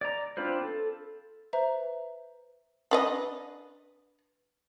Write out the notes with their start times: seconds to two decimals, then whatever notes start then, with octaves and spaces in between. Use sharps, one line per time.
0.01 D5 A#5
0.37 C4 D4 F4 B4 C5
0.62 A4
1.53 B4 C5 E5 A#5
2.91 D4 B4 D#5